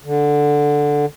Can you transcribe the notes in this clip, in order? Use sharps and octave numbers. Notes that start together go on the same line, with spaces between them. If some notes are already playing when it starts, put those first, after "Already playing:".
D3